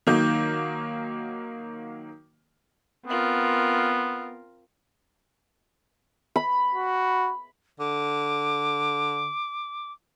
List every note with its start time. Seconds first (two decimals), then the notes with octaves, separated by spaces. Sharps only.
0.07 D#3 F#3 A#3 G6
3.06 B3 C4 F4 A#4
6.36 B5
6.74 F#4
7.80 D3 D6